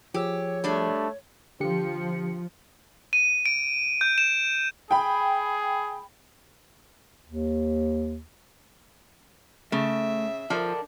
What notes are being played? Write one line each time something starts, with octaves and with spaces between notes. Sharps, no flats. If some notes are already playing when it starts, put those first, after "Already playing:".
F3 G4 G#4 C#5 E6
G3 A3 D4
D3 F3 G4 C#7
D#7
D7
G6
E7
G#4 G5 B5
D#2
C#3 A3 E5
F3 D4 A4 A#4